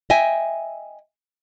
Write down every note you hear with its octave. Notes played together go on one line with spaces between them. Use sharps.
D#5 E5 G5 G#5